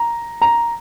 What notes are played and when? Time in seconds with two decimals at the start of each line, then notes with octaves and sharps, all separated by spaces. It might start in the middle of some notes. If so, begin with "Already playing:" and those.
Already playing: A#5
0.42 A#5